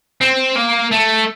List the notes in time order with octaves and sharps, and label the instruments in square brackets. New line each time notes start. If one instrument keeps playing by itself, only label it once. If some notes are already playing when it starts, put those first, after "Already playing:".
[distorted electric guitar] C4
A#3
A3